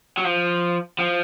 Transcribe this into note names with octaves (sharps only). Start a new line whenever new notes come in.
F#3
F3
F3